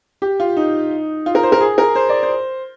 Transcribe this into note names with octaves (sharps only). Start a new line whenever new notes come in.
G4
F4
D#4
F4
A#4
C5
A#4
G#4
A#4
C5
D5
C5